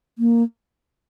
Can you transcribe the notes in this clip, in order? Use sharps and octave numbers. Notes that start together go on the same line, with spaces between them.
A#3